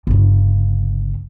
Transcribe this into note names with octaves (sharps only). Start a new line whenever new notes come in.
G1 C#3